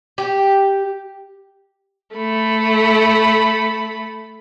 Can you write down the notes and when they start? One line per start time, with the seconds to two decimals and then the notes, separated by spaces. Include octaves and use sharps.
0.18 G4
2.16 A3 B5